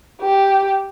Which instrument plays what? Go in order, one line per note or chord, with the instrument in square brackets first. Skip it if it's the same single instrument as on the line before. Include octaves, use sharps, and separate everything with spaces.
[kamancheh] G4